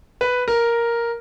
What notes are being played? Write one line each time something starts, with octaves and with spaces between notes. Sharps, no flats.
B4
A#4